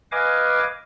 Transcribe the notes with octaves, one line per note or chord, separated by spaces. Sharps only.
B4 D#5 F5 G#5 D6